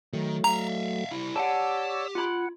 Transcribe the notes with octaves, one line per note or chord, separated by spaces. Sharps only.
D#3 F#3 A3
E5 F5 A#5
G3 E4
G4 C#5 D5 F#5 G5 A5 E6
F4 F#5 B5